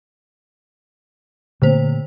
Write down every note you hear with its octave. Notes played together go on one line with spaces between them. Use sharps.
A#2 D3 A3 A#3 C5